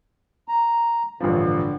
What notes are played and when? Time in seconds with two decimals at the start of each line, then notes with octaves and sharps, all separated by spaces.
0.48 A#5
1.20 A1 G2 D3 F3